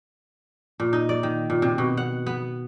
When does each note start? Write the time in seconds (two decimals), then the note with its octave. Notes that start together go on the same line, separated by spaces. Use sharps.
0.80 A#2
0.93 D#4
1.09 D5
1.23 D#3
1.50 A#2
1.62 C3
1.78 B2
1.97 F#5
2.26 B3